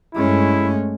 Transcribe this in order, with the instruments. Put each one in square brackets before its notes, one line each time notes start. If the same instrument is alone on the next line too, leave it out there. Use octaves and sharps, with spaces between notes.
[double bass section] G2 A3 [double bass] G#3 C#4 [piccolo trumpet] E4